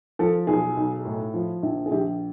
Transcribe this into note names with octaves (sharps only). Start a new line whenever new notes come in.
F3 A4
B1 G#4
B1
A2
F3
A#1
G#4
A#1 G4